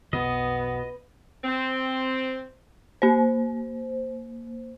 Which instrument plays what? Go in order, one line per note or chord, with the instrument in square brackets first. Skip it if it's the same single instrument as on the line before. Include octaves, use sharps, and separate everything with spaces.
[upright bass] B1 F2 [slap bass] B2 [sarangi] B3 [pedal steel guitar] D#5
[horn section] C4
[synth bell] A#3 C5